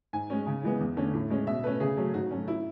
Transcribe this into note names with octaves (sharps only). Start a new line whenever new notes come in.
G#2 G#5
G#3 C#4
C#3
E3 G#3 B3
E2
D3 A3 C#4
A2
G#3 C#4
B2 E5
A3 C#4 B4
C#3 G#4
F#3 A3 C#4
G#2 F#4
F#3 A3 C#4
E4